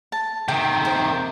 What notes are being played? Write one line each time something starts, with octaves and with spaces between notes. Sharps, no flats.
A5
C3 D#3 G5
C5